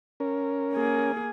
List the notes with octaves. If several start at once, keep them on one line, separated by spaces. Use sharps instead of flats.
C#4 A#4
A#3 G#4